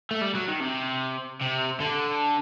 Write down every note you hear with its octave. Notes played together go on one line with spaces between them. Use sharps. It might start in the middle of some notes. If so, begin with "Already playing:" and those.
A3
G3
F#3
D#3
C3
C3
D3